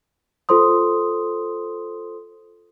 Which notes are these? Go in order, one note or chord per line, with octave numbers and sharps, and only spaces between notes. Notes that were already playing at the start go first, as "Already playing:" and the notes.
F4 A4 C5 C6 D#6